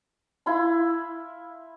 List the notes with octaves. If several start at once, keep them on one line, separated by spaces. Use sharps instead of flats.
E4 F4 B5 C6